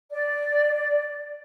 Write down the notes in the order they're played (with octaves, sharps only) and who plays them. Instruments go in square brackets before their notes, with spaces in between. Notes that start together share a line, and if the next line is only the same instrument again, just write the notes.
[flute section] D5